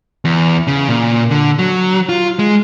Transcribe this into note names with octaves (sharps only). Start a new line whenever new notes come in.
E2
C#3
A#2
D3
F#3
F4
G#3